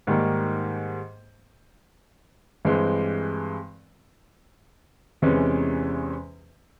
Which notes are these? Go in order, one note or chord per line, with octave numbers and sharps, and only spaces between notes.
G#2 D#3 G3 A#3
G2 E3 G#3 C4
E2 C3 E3 G#3 C#4